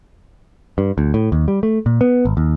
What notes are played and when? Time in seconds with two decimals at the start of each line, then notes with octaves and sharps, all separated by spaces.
0.78 G2
0.98 D2
1.14 A2
1.32 D#2
1.48 G3
1.63 A3
1.86 A#2
2.01 B3
2.25 G#1
2.37 D#2